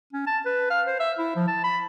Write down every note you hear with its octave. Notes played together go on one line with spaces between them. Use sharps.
C#4
A5
B4
F5
C5
E5
E4
F3
A5
B5